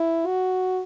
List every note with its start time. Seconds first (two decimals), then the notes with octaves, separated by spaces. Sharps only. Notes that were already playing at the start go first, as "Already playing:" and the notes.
Already playing: E4
0.27 F#4